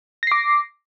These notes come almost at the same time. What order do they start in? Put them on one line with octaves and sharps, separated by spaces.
A#6 C7 D6